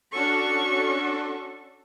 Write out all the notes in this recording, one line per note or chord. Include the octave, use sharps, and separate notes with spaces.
C#4 D4 F#4 A4 C#6